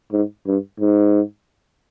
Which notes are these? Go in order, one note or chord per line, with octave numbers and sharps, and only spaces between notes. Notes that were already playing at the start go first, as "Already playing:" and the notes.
G#2
G2
G#2